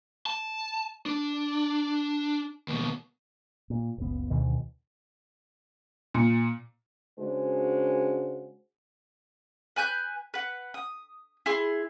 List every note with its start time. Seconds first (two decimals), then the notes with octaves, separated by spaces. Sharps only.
0.26 A5
1.06 D4
2.68 D#2 B2
3.70 A#2
3.98 F#1 C#2 B3
4.30 D2 B2 D#3
6.14 A#2
7.18 C#3 G#3 D4 F#4 C5
9.76 B4 G#5 F#6 G6
10.34 B4 F#5
10.74 D#6
11.46 E4 G#4 C6